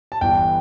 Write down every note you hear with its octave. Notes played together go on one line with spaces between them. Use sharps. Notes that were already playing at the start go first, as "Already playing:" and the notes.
A5
G1 G2 E3 G5